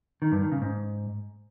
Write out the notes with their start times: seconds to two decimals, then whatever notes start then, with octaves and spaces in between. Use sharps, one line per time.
0.22 D#3
0.32 G2
0.42 D#3
0.52 C#3
0.62 G#2